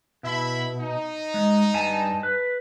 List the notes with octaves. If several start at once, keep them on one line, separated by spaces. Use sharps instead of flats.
B2 E4 E5 B5
D#4
G#3
G2 G#5 A5
B4